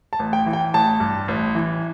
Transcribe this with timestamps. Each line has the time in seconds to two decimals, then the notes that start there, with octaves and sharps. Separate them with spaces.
0.13 A5
0.19 A1
0.33 G5
0.46 E3
0.53 G5
0.74 A1 A5
1.00 G2
1.28 A1
1.55 E3